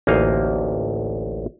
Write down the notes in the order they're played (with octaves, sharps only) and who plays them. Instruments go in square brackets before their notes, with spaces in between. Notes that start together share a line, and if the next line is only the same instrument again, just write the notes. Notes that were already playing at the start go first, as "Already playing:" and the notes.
[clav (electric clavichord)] A1 D2 A#3 D#4 F5 G#5